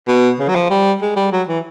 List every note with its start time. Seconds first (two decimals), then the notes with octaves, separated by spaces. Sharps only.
0.08 B2
0.39 C#3
0.49 F#3
0.56 F3
0.71 G3
1.02 G#3
1.16 G3
1.32 F#3
1.49 E3